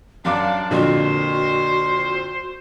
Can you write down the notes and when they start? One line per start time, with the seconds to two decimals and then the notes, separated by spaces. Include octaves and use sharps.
0.25 F#2 D4 F5 D6
0.71 F2 A#2 D3 F#4 C5